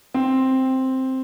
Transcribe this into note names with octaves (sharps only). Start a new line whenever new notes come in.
C4